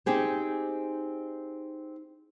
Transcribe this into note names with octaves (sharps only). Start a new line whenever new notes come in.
C4 D#4 G4 G#4 C5